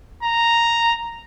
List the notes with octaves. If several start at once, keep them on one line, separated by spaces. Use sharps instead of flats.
A#5